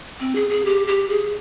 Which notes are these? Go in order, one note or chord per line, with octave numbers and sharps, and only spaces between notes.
C4
G#4
G#4
G4
G4
G#4